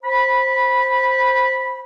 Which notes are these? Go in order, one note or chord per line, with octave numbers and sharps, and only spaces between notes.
C5 B5